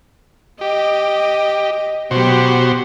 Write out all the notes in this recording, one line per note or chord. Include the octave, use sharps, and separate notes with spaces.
G4 D#5
B2 F#3 B3 F#4 G4 C5